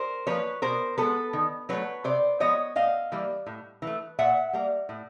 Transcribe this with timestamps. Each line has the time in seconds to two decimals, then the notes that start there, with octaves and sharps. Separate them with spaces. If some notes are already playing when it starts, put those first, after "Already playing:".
Already playing: A#4 C5
0.27 F3 A#3 B4 C#5
0.62 B2 A#4 C5
0.98 G#3 B3 A4 B4
1.33 D#3
1.69 F#3 A3 B4 C#5
2.04 C3 C5 D5
2.40 F3 G#3 B3 C#5 D#5
2.75 A2 D#5 F5
3.12 E3 G3 A#3
3.46 A2
3.82 E3 A3
4.19 A#2 E5 F#5
4.53 G3 A#3
4.89 A2